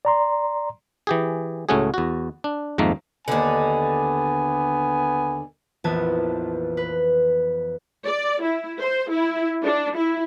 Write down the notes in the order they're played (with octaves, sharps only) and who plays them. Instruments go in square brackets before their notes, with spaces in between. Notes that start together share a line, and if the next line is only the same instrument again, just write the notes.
[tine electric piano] D5 A#5 C6
[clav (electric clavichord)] E3 G4 G#4
C#2 A2 A3 C#4 F#4 G#4
E2 F#4
D4
F2 G#2 D#3 A3 A#3
[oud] D#2 D3 [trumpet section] B3 G#5
[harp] A#1 F2 E3 B3 A5 G#6
B4
[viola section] D5
E4
C5
E4
D4
E4